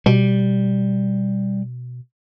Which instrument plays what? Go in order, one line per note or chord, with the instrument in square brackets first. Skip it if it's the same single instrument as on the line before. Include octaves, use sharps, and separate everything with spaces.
[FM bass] B2 [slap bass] G3